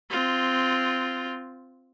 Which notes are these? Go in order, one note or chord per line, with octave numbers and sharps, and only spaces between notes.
C4 F4